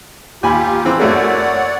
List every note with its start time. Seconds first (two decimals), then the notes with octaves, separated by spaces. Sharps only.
0.43 D#2 F4 G4 G#5 B5
0.85 E3 C4
1.00 F#2 A3 A#3 C#5 D5 F#5